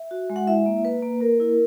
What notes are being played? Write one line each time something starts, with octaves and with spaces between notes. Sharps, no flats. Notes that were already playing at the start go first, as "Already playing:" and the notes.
Already playing: E5
F#4
G#3
F#5
E4 E5
A#3
A#3 B4
A#3
A#3 A#4
E4